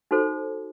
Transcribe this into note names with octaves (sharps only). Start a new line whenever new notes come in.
D#4 F#4 A4 C5